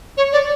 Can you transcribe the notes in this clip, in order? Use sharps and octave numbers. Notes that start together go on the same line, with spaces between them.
C#5
D5